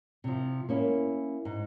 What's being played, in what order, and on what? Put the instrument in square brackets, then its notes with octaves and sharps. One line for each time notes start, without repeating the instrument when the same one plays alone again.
[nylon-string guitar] C3 F3
A#3 C#4 E4
G#2